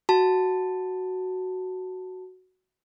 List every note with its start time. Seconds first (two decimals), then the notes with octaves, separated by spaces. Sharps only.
0.09 F#4 A5